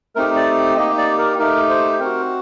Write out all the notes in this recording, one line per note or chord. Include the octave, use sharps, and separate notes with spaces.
A3 C4 D#4 G4 A#4
D5
A#3 D#4 G4 D#5
D5
A#4
A3 D#4 G4 A#4
C5
C4 F#4 A#4